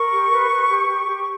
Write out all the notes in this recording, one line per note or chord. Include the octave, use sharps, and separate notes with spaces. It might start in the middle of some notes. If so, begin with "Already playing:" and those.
Already playing: A#4 C#6
G4
B4
B4
G4
G4
G4